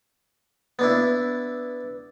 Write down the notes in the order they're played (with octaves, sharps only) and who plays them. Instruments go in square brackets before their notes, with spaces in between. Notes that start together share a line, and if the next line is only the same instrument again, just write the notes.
[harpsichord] B3 D4 E4